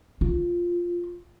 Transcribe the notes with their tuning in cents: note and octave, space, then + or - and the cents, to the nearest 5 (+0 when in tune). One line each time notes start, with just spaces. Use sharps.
F4 +0